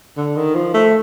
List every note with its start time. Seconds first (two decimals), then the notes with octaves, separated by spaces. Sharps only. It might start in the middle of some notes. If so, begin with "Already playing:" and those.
0.17 D3
0.36 D#3
0.55 F3
0.74 A3